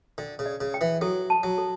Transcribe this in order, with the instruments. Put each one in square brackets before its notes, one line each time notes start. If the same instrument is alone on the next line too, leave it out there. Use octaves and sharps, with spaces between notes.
[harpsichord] D3 [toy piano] G5
[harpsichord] C#3
[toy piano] D5
[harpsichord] C#3
[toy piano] G5
[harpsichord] E3
[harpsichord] F#3 [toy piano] A4
[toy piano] A5
[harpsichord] F#3
[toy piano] A4